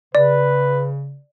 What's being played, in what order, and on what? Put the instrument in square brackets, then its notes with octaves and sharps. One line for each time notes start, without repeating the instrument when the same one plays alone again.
[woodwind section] C#3 [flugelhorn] B4 [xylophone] D5